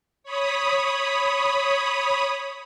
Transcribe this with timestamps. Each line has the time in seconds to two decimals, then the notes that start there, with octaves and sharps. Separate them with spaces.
0.23 C#5 B5 D#6